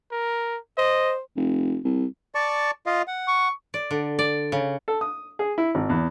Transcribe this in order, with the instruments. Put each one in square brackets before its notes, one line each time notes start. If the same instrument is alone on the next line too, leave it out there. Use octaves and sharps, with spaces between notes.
[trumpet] A#4
[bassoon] C5 [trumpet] D#5
[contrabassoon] F1
C2
[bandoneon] D5 A5 C#6
F4 D#5 F5
F#5
[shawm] C#6
[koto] D5
D3
D5
C#3
[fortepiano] A4
D#6
G#4
E4
G#1
E2